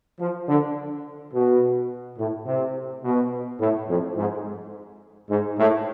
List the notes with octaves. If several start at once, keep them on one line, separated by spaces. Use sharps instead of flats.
F3
D3
B2
A2
C3
B2
A2
F2
G#2
G#2
A2